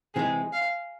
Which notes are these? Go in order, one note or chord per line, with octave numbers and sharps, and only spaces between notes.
C3 E3 G#3 G#4
F5